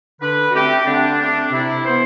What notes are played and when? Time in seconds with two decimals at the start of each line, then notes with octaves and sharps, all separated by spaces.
0.21 D3 B4
0.50 F#4
0.54 A3 C4 G4
0.86 D3 D4
1.20 A3 C4 D4
1.52 C3 E4
1.84 E3 B3 C5